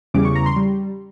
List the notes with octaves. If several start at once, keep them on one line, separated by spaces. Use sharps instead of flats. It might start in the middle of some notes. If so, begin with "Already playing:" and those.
E2 C#3 E3 G3 D6
C#6
A#5
C6
G3